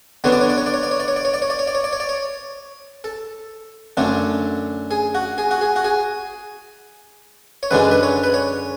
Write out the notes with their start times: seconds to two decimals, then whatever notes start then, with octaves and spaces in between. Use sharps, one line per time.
0.24 D3 F#3 B3 D4 C#5
0.32 D5
0.41 C#5
0.49 D5
0.58 C#5
0.66 D5
0.74 C#5
0.83 D5
0.91 C#5
1.00 D5
1.08 C#5
1.16 D5
1.25 C#5
1.34 D5
1.42 C#5
1.50 D5
1.59 C#5
1.67 D5
1.75 C#5
1.84 D5
1.93 C#5
2.00 D5
2.09 C#5
3.04 A4
3.97 F#2 D3 A3 D4
4.91 G#4
5.15 F#4
5.38 G#4
5.51 F#4
5.61 G#4
5.76 F#4
5.85 G#4
7.63 C#5
7.71 F#2 D3 G#3 D4 B4
7.91 B4
8.03 C#5
8.23 B4
8.34 C#5